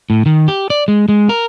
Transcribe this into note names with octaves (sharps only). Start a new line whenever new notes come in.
A2
D#3
G4
D5
G#3
G#3
A#4